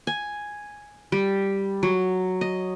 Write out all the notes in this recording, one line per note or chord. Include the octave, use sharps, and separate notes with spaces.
G#5
G3
F#3
D#5